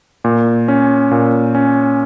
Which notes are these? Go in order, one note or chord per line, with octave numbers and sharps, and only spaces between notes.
A#2
C#4
A#2
C#4